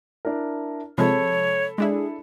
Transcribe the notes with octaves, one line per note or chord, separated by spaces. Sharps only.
D4 E4 A#4
C3 F3 G#3 A4 C#5 B5
G#3 D4 E4 G#4